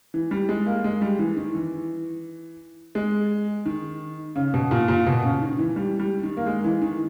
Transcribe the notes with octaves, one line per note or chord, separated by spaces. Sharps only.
E3
G3
G#3
A#3
G#3
G3
E3
D#3
E3
G#3
D#3
C#3
B2
A#2
A#2
B2
C#3
D#3
E3
G3
G3
D#3
A#3
G#3
E3
D#3